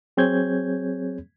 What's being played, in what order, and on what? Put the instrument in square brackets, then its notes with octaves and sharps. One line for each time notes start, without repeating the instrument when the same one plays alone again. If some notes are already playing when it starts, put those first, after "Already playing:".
[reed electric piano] F#3 C4 G#4 C#5 G6 G#6